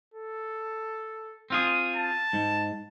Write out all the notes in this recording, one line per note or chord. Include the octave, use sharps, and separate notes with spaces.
A4
C4 F4 G#4
A5
G#2